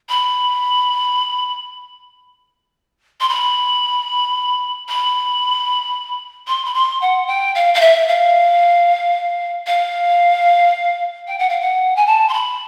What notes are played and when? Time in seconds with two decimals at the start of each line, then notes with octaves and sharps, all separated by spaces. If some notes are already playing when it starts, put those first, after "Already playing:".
0.09 B5
3.21 C6
3.29 B5
4.89 B5
6.48 C6
6.65 B5
6.74 C6
7.02 F#5
7.27 G5
7.55 F5
7.74 F5
7.81 E5
8.08 F5
9.67 F5
11.28 G5
11.39 F#5
11.49 F5
11.61 F#5
11.96 G#5
12.07 A5
12.29 C6
12.33 B5